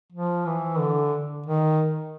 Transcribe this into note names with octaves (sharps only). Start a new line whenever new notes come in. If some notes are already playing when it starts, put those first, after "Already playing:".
F3
E3
D3
D#3